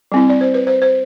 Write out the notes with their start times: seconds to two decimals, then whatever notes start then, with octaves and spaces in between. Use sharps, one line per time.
0.12 G3 C4 E4
0.30 D5
0.41 C5
0.54 B4
0.67 C5
0.82 C5